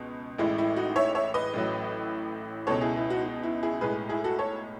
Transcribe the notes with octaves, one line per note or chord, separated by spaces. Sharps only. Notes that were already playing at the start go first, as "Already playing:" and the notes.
Already playing: C#2 B2
A1 A2 G#3 E4
E4
D#4 F#4
C#5 E5
C#5 E5
B4 D#5
A1 A2 F#3
C#2 B2 G#3 A4 C#5
E4 G#4
E4
D#4 F#4
D#4
E4
E4 G#4
B1 A2 G#3 G#4 B4
E4 G#4
F#4 A4
A4 C#5